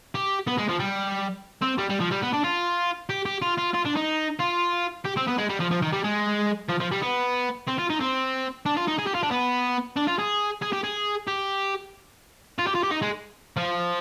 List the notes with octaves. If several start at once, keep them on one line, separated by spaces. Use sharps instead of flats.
G4
B3
G#3
F3
G3
C4
G3
G3
F3
G3
B3
D4
F4
G4
G4
F4
F4
F4
D4
D#4
F4
G4
C4
B3
G#3
G3
F3
F3
D#3
G3
G#3
F3
F3
G3
B3
C4
F4
D#4
C4
D4
F4
D#4
G#4
G4
F4
D4
B3
D4
F4
G#4
G#4
G4
G#4
G4
F4
G4
F4
G4
D#4
G#3
F3